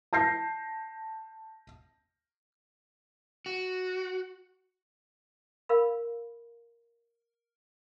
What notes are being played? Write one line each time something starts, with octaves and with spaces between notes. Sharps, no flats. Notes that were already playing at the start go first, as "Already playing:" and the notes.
A5 G6 A#6 C7
F#4
A#4 F5 B5